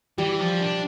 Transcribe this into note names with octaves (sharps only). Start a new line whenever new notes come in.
E3 G3
F3
D4